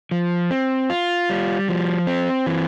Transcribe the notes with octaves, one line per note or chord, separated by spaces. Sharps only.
F3
C4
F4
G3
F3
C4
E3